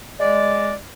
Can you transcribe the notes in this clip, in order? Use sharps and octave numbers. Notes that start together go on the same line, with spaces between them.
G#3 D5